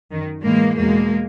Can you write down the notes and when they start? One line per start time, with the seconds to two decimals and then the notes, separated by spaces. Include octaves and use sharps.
0.11 F#2 D#3
0.45 A2 E3 G#3 A#3
0.78 E2 B2 G#3 A#3